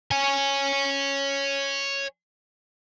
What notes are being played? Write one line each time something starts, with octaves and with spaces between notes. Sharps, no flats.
C#5 G#5